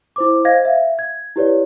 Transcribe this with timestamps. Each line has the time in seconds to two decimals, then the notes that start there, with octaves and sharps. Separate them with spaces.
0.16 E4 C5 D6
0.45 C5 D#5 F5 G#6 A#6
0.65 E5 F5
0.99 G#6
1.36 E4 G4 B4 C#5 D5